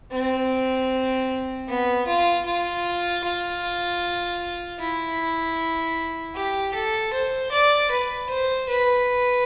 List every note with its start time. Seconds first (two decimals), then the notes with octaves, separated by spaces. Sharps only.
0.12 C4
1.68 B3
2.07 F4
2.46 F4
3.24 F4
4.79 E4
6.35 G4
6.74 A4
7.13 C5
7.52 D5
7.91 B4
8.29 C5
8.69 B4